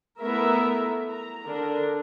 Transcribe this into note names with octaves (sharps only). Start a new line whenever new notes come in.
A3 B3 E4 A#4 E5
A#5
D3 D4 A#4